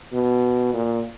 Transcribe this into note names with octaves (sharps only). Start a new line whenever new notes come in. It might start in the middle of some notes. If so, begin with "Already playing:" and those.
B2
A#2